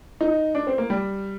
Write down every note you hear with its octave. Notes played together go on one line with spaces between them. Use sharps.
D#4
D4
C4
A#3
G3